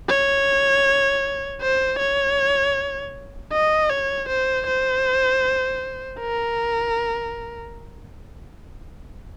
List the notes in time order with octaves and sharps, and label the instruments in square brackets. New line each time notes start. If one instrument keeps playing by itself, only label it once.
[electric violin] C#5
C5
C#5
D#5
C#5
C5
C5
A#4